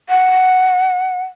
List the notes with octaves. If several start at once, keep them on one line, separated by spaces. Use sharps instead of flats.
F#5